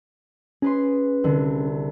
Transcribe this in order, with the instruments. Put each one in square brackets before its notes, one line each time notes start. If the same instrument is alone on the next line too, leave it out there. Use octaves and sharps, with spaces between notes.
[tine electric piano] C#4 [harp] G#4 B4 C6
[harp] C2 D3